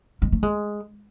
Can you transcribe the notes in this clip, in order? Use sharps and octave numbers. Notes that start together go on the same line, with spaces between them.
G#3
A3
G#3